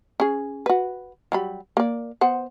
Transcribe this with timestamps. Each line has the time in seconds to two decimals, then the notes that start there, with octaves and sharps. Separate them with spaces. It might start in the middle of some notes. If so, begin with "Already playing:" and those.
0.20 C#4 G#4
0.66 F#4 B4
1.32 F#3 G3 B5
1.77 A#3 D5
2.21 B3 C5 F#5